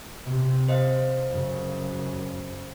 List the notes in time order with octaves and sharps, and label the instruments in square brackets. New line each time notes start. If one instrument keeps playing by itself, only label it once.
[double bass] C3
[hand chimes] C5 D#5 F5
[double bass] F#2 C#3